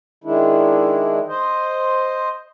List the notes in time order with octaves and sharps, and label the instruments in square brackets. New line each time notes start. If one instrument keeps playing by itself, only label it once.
[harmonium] D#3 G#3 D4 E4
C5 D#5